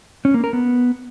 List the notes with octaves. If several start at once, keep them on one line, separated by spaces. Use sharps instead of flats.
C#4
A#3
A#4
B3